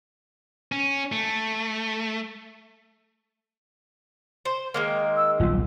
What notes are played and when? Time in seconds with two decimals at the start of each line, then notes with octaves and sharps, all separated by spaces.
0.72 C#4
1.12 A3
4.45 C5
4.74 D#3 G#3 A#3
5.16 E6
5.40 D#1 B1 F4